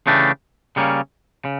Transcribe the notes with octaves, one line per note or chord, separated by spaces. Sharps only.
C#3 E3 A3 D4 G4
C#3 G3 A#3 C#4
C#3